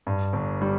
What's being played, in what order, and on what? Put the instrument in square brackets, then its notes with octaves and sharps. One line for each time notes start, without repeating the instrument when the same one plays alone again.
[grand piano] G2
G1
G3